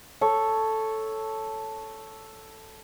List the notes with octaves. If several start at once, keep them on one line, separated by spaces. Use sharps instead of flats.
A4 C#5